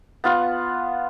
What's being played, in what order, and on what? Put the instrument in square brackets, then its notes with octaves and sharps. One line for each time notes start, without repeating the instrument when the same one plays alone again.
[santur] B3 F4 F#5